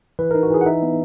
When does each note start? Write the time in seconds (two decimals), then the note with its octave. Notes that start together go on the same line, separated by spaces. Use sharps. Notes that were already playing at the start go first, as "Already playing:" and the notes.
0.19 E3 B4
0.31 D#4 A#4
0.43 F#4
0.50 E3 G#4
0.61 F#5
0.66 D#4 E5
0.83 B3